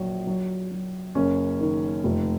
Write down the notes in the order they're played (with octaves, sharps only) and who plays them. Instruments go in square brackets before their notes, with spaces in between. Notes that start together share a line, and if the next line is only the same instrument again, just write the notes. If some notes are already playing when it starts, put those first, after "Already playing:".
Already playing: [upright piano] A#1 F#3
F#3
F#3
F#1 C#4
D#3
F1